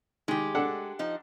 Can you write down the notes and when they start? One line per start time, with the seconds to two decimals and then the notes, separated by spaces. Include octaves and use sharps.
0.28 D#3 G#3 G4
0.55 D4 A4 F#5
0.99 F3 D#4